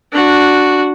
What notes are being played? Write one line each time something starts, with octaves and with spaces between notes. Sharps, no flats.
D4 F#4